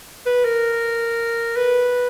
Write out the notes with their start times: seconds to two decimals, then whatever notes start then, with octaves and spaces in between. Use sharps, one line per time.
0.26 B4
0.45 A#4
1.57 B4